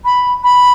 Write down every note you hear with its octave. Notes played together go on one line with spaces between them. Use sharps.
B5
B5